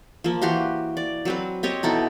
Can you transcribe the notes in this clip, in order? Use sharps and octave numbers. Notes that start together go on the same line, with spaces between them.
F3 A#3
E3 F#4 G4 C6
D5
F#3 C4 B4
C4 G4 C#5 D#5
B2 D#4 E4 A4